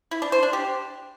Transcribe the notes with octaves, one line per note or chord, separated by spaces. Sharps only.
E4
D4
C5
D4
G4